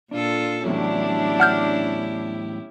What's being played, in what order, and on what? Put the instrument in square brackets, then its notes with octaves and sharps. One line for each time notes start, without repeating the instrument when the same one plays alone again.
[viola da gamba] A#2 F4 A4 [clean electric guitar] D4
[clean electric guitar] E2 A2 F#3 [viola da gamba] C#4 E4 G4 [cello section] D4
[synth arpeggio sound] F#5 F6 G6